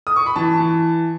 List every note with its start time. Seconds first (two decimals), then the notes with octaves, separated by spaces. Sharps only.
0.07 D#6
0.16 C#6
0.26 B5
0.36 E3 A5
0.60 E3